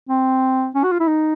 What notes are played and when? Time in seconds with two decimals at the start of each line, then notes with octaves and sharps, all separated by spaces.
0.09 C4
0.75 C#4
0.83 F#4
0.91 F4
0.99 E4
1.07 D#4